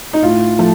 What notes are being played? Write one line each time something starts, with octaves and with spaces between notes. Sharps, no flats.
D#4
A2 F4
F3 A3